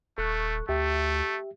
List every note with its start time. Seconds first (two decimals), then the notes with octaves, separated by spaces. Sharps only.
0.18 D#1 A3 A4 C#6 F#6
0.69 D2 A3 G4 E5